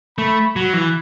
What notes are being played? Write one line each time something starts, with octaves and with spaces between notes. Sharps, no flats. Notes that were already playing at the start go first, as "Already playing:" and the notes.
A3 B5
F#3 B5
E3